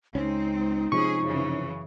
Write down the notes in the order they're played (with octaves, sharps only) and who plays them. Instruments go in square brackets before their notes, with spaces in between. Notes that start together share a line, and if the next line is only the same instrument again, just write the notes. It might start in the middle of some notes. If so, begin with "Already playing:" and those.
[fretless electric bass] C#2 C#4 [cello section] G#3 C4 [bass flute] D#4
[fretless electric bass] C3 F3 G#3 [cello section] C#4 G#4 [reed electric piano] C#6
[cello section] F#2 C#3 E3